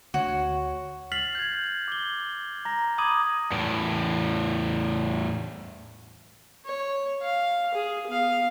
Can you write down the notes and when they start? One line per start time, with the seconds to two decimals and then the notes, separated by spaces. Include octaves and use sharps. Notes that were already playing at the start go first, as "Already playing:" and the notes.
0.14 D2 F#4 C#5
1.12 F6 A6 B6 C7 F7 F#7
1.35 G6 G#6
1.88 D6 G7
2.65 A#5 A#6
2.98 B5 D6 D#6 G#6 D#7 F#7
3.53 E2 A2
6.65 C#5
7.22 F5
7.74 G#4
8.07 B3 F5